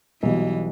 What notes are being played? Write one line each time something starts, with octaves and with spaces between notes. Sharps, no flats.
B1 B2 E3 G3